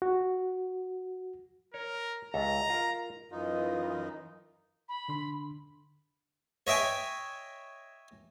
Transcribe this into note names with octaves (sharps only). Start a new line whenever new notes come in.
F#4
A#4 C#5
C#2 A4 E5 A#5
F4 A#4
F#2 E3 D#4 F4 D#5
B5
D3 D4 C6
C#5 D#5 E5 G5 G#5